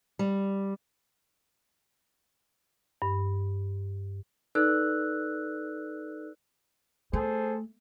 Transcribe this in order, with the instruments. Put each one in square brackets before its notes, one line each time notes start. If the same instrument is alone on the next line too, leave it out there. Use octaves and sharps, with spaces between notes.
[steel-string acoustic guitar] G3
[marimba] G2
[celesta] D#4 A4 B4 D5 E6 F#6
[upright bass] A3 [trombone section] G#4 A4 C5